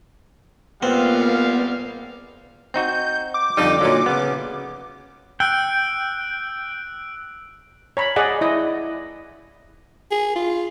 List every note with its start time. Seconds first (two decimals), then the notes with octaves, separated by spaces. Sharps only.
0.83 A#2 G3 G#3 B3 C4 F5
2.74 C4 D#4 F#4 G6
3.34 D6
3.57 F2 D3 G3 D#4
3.81 A#2 D3 F#3
4.06 C#3 B3
5.40 G5 E6 F#6 D7
7.97 C#5 A#5 B5
8.16 G#4 D5 D#5 F#5
8.41 E4 D#5
10.11 G#4
10.35 F4